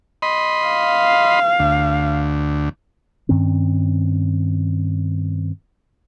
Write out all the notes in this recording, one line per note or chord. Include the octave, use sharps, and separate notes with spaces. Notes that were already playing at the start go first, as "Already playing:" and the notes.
D#5 B5 C6
F5
D2
G2 D#3 C4 C#4